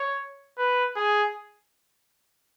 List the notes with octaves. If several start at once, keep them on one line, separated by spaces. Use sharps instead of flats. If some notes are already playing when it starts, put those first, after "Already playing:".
Already playing: C#5
B4
G#4